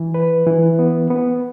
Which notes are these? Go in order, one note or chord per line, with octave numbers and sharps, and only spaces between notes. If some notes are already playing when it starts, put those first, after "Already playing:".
Already playing: E3
B4
E3
B3
B3